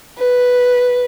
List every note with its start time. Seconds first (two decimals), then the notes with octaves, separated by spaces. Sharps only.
0.18 B4